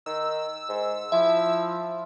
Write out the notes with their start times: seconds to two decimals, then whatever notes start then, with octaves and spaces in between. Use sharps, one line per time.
0.06 D#3 E6
0.69 G#2
1.12 F3 E4 E5